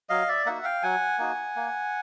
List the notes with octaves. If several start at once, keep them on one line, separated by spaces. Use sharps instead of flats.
F#3 D#5 F5
D5 E5
A#3 D#4 F#4 E5 F#5
F5 G5
F#3 F#5 G#5
A#3 D#4 F#4
A#3